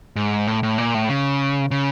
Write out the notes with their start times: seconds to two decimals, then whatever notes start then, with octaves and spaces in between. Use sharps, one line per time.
0.16 G#2
0.47 A2
0.63 A2
0.78 A#2
0.94 A2
1.09 C#3
1.71 C#3